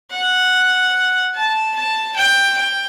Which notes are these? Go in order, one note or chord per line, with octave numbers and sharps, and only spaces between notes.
F#5
A5
A5
G5
G5